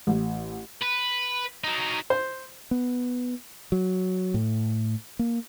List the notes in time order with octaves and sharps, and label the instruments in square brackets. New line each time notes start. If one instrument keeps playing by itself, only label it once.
[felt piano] A1
[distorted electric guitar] B4
F#3 D#4
[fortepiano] C5
[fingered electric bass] B3
F#3
A2
A#3